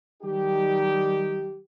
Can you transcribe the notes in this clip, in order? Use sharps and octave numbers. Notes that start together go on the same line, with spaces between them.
D#3 F#3 G3 D#4 G4